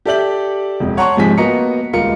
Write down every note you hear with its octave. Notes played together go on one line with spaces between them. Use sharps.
G4 A4 D5 E5 G6 F#7
E1 F2
C#5 F#5 A5 A#5 C6 C#6
G#2 C3 F3 G#3 G#5 B6
A#3 B3 F#4 D#5 A#5 C#7
D#1 C#2 F4 A#4 C#7